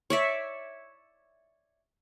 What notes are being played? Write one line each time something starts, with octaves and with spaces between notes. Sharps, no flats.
C#5 D5 E5